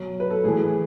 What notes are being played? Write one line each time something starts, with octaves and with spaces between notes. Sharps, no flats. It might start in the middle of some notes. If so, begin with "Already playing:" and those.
Already playing: B2 F#3
B4
A4
A2 E3 G#4